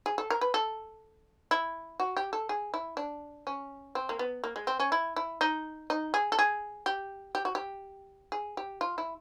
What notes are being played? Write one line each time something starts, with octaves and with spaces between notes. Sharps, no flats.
G#4
A4
A#4
B4
A4
E4
F#4
G4
A4
G#4
E4
D4
C#4
C4
A#3
B3
A#3
G#3
C4
C#4
E4
E4
D#4
D#4
G#4
A4
G#4
G4
G4
F#4
G4
G#4
G4
F4
E4